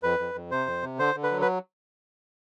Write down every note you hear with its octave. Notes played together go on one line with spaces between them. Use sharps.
F2 B4
F2
F2
C3 C5
F2
C3
D3 C5
D3
B4
F#3
B4